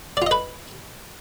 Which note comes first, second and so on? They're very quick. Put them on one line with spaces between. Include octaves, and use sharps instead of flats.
D5 F4 D#5 B4